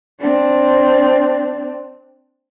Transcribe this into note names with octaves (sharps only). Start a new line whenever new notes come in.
C4 D4